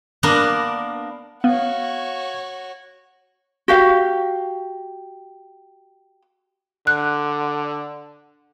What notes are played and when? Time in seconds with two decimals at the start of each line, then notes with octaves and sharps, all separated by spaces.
0.23 A#3 B3 D4 A#4
1.44 B3 F#4 C#5 F5
3.68 F#4 G4 F5
6.87 D3 F#6